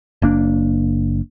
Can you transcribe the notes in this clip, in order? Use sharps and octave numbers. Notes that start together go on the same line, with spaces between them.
F#1 A#3 D4